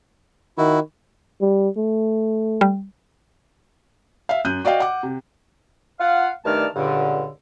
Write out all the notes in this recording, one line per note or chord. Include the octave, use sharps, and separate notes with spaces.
D#3 E4 F#4
G3
A3
G3
E5 F5
F#2 F#6 G6 D#7
F#4 D5 D#5 F5 G5
F#5 D6
C3
F4 F5 F#5
G2 D#3 A3 D5 A5 F6
C#2 G2 A#2 D3